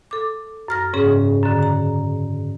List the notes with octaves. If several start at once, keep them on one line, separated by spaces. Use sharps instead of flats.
A4 D6
F#2 F6 A#6
G#2 C#3 C#4 G#4
F#2 D3
A#5